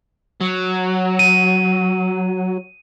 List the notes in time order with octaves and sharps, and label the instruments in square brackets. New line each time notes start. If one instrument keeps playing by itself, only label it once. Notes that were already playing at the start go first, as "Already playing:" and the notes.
[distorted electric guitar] F#3
[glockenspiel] D#7